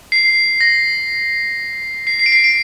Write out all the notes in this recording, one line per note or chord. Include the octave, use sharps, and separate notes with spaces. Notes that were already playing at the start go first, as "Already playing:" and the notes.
C7
A#6
C7
C7
D7
C7
D7